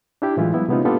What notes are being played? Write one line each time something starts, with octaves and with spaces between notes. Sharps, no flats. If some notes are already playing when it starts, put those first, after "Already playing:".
D4 E4 G4
A2 E3 F#3 G#3 E4 F4
G3 B3 E4
C3 G#3 B3 C#4 D#4 F4
A#3 B3 D4 F4 G4 A4